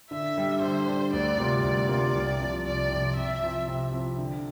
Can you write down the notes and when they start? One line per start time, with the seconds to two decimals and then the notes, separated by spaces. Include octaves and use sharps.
0.11 D3 E5
0.37 G3 D4
0.62 D3 C5
0.87 G3 D4
1.13 D2 D5
1.38 C3 G3 A#3 F4
1.64 D2 D5
1.89 C3 G3 A#3 F4
2.14 C2
2.40 C3 F3
2.66 C2 D5
2.91 C3 F3
3.16 C3 E5
3.42 F3 C4 E4
3.68 C3
3.93 F3 C4 E4
4.18 D3